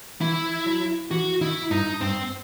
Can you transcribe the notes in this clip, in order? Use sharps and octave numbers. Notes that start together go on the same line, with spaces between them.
E3 E4
F#3
E3 F#4
D#3 E4
G2 D#4
G2 C4